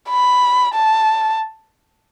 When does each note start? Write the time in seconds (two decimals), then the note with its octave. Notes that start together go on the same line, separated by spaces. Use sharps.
0.10 B5
0.75 A5